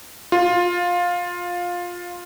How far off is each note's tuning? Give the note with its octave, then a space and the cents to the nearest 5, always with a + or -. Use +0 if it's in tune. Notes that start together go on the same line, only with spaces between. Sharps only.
F4 +15